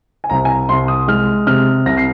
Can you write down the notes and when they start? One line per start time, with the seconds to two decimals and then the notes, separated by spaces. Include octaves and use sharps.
0.24 G#5
0.30 C2 A#5
0.45 G#5
0.50 A#5
0.69 C2 C6
0.88 D#6
1.08 G#3 F6
1.47 C3 F6
1.86 C2 A#6
1.97 C7